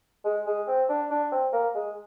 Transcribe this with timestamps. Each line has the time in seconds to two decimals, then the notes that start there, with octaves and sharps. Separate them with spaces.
0.25 G#3
0.46 G#3
0.67 C4
0.89 D4
1.11 D4
1.32 C4
1.53 A#3
1.75 G#3